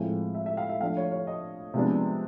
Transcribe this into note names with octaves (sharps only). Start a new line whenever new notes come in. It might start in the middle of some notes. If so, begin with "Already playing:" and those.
Already playing: A2 F3 G#3 C4 F5
E5
E5
F5
E5
F3 A3 D4 F5
C#5
C#5
D#5
C3 F3 G#3 B3 D4